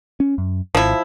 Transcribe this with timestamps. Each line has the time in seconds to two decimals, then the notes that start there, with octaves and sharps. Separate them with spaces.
0.20 C#4
0.38 F#2
0.75 G#1 F3 E4